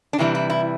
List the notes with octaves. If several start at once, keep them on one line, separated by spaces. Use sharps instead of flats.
D4
C3 E3 G3 E4
E4
E4